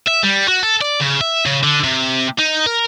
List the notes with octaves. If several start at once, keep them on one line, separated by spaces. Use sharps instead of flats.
E5
G3
F#4
A4
D5
C#3
E5
C#3
D3
C3
D#4
A#4